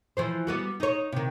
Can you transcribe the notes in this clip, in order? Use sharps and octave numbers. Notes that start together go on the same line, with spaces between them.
E3 F3 C5
G3 B3 F#4
D#4 C#5
C3 D#3